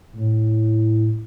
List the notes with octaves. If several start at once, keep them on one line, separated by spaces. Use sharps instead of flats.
A2